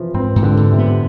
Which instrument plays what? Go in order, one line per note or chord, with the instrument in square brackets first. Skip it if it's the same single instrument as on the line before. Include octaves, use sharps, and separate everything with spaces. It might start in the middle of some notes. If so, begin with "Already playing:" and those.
Already playing: [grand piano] C3 E3 F3
[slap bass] G#2 [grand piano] C4
[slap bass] G#2
[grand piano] D3
[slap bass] G#2
[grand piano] C3
[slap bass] B3